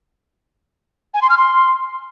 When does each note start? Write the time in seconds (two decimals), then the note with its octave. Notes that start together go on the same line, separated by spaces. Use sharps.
1.14 G#5
1.21 C6
1.29 F6
1.37 C6